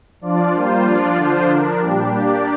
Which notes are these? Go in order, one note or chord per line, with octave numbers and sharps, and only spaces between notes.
F3 D4 F4 D5
G3 A#3 F4 C5
F3 D4 F4 D5
D3 F3 D4 F4 C5
F3 D4 A#4
A#2 G3 D4 G4
A#3 D4 G4 D5